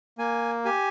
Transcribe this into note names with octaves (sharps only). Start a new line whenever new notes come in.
A#3 G#5
G4 G#5